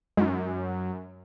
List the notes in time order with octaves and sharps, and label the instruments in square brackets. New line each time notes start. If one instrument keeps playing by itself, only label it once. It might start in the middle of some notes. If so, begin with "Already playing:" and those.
[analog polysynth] F#2 [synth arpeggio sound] G#3 D#4